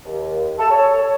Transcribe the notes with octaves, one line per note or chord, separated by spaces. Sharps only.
D#2
A4
C#5